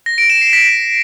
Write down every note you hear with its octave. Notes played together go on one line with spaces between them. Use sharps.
A#6
D7
E7
C7
B6